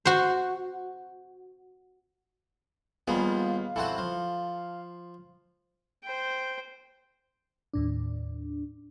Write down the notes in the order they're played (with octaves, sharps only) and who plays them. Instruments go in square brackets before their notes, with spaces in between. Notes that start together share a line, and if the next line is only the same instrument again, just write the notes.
[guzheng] F#4 C5
[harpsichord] D#2 F3 G3 [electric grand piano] B3 G#4 [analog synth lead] F5
[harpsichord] E3 C4 F#4 [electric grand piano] A4
[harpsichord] F3
[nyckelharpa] C5 G5
[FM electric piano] D#2 A2 D4